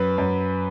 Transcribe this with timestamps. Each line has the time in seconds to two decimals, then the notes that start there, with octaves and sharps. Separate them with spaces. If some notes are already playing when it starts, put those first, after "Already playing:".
Already playing: F#2 B4
0.18 F#2